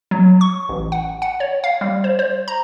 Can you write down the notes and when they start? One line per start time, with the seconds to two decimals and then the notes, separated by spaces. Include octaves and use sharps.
0.11 F#3
0.41 C#6
0.69 A1
0.92 F#5
1.22 F#5
1.40 C#5
1.64 F5
1.81 G3
2.04 C5
2.19 C5
2.48 A#5